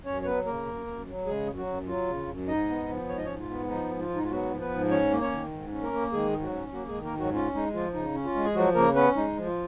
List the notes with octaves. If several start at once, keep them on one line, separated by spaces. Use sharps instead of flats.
F#2 C#4 C#5
C#5
F#3 B3 B4
C#3 A#3 A#4
F#2
F#2
F#3
C#3 G#3 G#4
F#2
F#3 F#4
F#2
F#3 F4
C#3
F#2
G#2 D#4 D#5
B3
F3
G#2 C#5
D#5
G#2 C#4 C#5
F4
B3
F3 D#4
G#2
F4
G#2
D#4
F4
F#3 B3 F#4
F3
B3 B4
G#2
C#4 C#5
A#3
C#4 C#5
D#3
G#2
C#4
A#3 A#4
A#3
D#3 G#3 G#4
G#2
F#3 F#4
C#4
F#3 A#3 F#4
G#3 G#4
D#3
A#3 A#4
G#2 F#3 F#4
C#4 F4
G#3 D#4
F3 F4
C#3 D#4
C#4
F4
G#3
G#4
F3 F#3 F#4
C#3 A#3 A#4
B3 C#4 B4
G#3 D#4
F3
F4